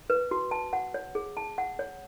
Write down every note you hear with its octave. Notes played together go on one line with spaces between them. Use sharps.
B4
F#4
A5
F#5
C#5
G#4
A5
F#5
C#5